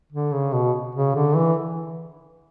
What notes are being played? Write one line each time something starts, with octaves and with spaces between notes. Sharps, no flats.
D3
C#3
B2
C#3
D3
E3